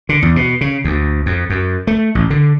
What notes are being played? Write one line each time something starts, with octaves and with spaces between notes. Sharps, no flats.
D3
E2
B2
C#3
D2
F2
F#2
A3
A1
D3